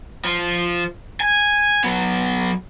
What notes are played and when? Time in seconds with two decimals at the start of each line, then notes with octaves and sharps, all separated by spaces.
0.25 F3
1.20 G#5
1.84 F#3 B3